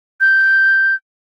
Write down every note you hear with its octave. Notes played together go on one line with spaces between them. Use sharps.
G6